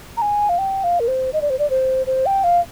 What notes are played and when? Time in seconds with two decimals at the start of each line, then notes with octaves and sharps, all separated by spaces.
0.17 A#5
0.22 G#5
0.49 F5
0.58 G5
0.84 F5
1.00 A#4
1.08 C5
1.33 D#5
1.42 D5
1.50 C5
1.59 D5
1.70 C5
2.07 C5
2.26 G5
2.44 F5